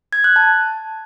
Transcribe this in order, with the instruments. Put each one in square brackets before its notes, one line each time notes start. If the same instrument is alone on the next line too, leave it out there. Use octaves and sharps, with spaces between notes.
[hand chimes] G#6
F#6
A5